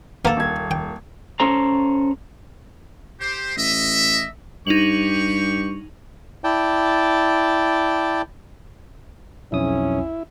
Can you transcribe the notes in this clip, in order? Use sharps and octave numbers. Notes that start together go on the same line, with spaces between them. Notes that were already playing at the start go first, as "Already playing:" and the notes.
A#3 B3 A4 F5
D#1 G#6
G5
C#4 A4 C5 A#5
G4 C5
A1 D#5 E5
G2 D#4 G4 C#6 F7 F#7
E4 D5 G5 A5
B1 F2 C#4 E4 D#6